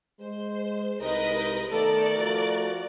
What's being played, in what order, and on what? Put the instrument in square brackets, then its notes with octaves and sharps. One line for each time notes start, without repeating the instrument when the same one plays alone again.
[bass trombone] G#3 [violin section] C5
[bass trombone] C2 [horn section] G3 G#3 D#4 [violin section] A#4 B4 D#5
[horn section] D#3 B3 A4 [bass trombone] A3 [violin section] A#4 D5
[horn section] F3 F4 F#4